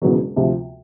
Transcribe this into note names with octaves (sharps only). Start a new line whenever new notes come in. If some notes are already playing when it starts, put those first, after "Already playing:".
E1 E2 C#3 F#3 B3
D2 C3 F3